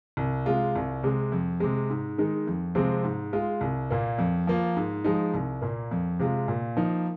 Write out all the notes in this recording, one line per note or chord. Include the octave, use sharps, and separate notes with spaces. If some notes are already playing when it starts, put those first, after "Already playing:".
C2
C3 G#3 F4
C2
C3 G#3
F2
C3 G#3
G#2
D#3 G#3 D#4
F2
C3 F3 G#3 C4
G#2
G#3 F4
C2
A#2 A#3
F2
F3 A#3 F4
G#2
F3 G#3 D#4
C2
A#2 A#3
F2
C3 G#3 F4
A#2
F3 A#3 D#4